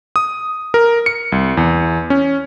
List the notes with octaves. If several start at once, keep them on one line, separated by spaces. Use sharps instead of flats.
D#6
A#4
C#7
C2
E2
C#4